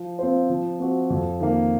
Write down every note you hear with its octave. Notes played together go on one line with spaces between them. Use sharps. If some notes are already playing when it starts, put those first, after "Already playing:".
Already playing: F3
C4 F4 C5
F3
C4 F#4
F2
D#3 A#3